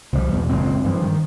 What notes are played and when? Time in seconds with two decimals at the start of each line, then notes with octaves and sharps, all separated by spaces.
0.13 C2 C3 F3 G3
0.32 E2 B2
0.49 F#1 C#2 A#2 C4
0.84 G2 E3 F3
1.02 D#3